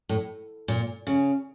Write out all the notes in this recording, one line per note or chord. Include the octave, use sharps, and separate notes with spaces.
A2
A#2
C#3